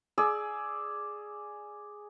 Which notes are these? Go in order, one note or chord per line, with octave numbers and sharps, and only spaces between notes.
G#4 D5 E6